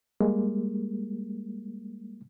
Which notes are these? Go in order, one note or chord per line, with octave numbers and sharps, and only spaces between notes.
G3 G#3 A#3